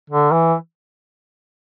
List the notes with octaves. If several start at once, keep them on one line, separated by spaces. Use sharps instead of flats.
D3
E3